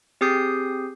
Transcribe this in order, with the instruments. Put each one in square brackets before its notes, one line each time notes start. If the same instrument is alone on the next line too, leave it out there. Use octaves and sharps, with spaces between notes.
[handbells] C4 G4 G#4 D#6 G6 C7